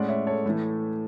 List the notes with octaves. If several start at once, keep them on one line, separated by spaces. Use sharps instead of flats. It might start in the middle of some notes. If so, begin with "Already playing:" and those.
Already playing: A2 G#3 C#4 D5 F#5
C#5 E5
A4 C#5
A2 E3 A3